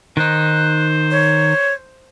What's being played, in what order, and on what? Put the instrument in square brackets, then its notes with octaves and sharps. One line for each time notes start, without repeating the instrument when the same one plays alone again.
[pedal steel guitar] D#3 D#4 [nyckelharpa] C5 [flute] F#6
[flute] C#5